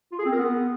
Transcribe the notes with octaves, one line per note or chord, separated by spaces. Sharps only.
F4
G#4
C4
A#4
B3